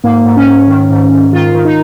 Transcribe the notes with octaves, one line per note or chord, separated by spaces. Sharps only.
G#2 A#3
G#2
C#4
G#2
D#3
G#2
G#2
D#3 F4
D#3
D#4